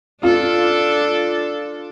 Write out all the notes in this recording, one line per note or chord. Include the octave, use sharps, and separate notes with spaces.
D4 F4 A4